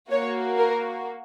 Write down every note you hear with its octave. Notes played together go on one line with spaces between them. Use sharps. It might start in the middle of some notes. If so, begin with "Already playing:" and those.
A#3 F#4 C#5
A#4